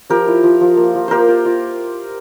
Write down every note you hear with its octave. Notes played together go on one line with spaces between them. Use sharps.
F3 G4 A#4
E4
F3
F3
A#3
F3
A#3 G4 A#4 C5
F4
F4